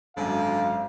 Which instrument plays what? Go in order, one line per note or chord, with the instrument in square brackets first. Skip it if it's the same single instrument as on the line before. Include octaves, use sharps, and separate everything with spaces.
[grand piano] G#1 F#2 [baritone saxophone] D3 [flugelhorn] F5